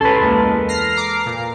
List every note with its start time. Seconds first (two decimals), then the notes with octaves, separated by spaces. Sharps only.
0.01 C#2 C#4 A4 B4 C6
0.21 E2 G#3 A#3
0.69 F6 A#6 C7
0.96 A#5 D6 C7
1.26 A#2